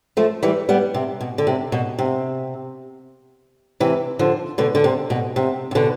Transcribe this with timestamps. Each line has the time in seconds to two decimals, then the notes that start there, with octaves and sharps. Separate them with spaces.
0.17 F3 A3
0.43 E3 G3
0.69 G3 B3
0.94 C3
1.21 B2
1.38 D3
1.47 C3
1.72 B2
1.99 C3
3.80 C3 E3
4.19 D3 F3
4.58 B2 D3
4.75 D3
4.84 C3
5.10 B2
5.36 C3
5.71 C3
5.75 B2 D3